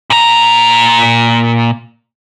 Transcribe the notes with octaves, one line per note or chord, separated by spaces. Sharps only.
A#2 A#5